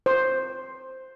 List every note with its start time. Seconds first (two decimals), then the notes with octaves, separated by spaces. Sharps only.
0.06 C5